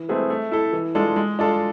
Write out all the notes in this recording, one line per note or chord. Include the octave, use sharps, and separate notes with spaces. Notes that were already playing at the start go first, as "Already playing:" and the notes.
Already playing: E3
A3 C4 G#4 B4
A3
E4 A4
E3
G#3 D4 F4 A4
G#3
D4 F4 A4